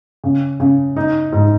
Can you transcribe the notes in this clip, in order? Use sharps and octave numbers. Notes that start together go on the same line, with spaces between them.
C#3
C#3
D#4
G#2